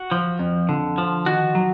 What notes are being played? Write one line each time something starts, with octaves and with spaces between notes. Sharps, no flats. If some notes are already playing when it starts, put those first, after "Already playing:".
Already playing: F#4
F3
F2
D3
F3
D#3 F#4
F#3